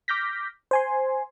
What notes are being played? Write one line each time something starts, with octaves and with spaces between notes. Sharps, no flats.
D6 F6 G6 A#6 B6
C5 G#5 C6